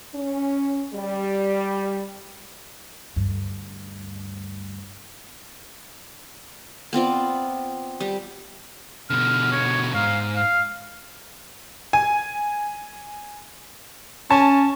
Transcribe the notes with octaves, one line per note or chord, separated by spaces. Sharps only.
C#4
G3
D2 G2
B3 C4 F4 D5
G3 G4
B2 D3 F6
C#5
G#2 F5
F5
G#5
C#4 A5